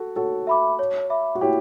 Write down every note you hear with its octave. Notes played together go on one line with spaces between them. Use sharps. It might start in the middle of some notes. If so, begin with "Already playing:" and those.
Already playing: F#4 A4
F#4 A4 C#5
E5 B5 D6
C#5
E5 B5 D6
F#4
E4 G4 C#5